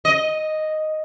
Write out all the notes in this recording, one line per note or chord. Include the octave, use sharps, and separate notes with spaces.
D#5